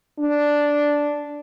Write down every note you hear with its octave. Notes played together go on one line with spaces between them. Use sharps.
D4